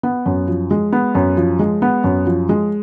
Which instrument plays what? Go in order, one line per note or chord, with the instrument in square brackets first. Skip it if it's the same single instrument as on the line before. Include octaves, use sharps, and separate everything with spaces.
[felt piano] B3
F#2
F3
G#3
B3
F#2
F3
G#3
B3
F#2
F3
G#3